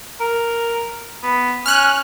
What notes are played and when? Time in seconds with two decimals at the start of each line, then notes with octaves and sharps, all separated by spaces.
0.20 A#4
1.23 B3
1.66 C#4 F6 F#6